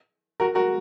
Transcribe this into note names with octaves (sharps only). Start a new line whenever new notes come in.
F#4 A#4
F#4 A#4